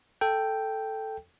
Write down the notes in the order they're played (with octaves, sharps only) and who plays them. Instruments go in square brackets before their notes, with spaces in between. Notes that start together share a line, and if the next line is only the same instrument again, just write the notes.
[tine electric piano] A4 G5